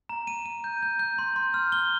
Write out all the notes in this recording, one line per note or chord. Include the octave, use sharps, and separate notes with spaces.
A#5
D#7
D#7
G6
G6
G6
C6
C6
F6
G7